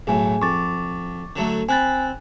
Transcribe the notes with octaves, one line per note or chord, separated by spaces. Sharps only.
B1 A2 G#4 G#5
F2 C#6 D6 A6
D3 F#3 A3
C4 G#5 B5 F#6 A6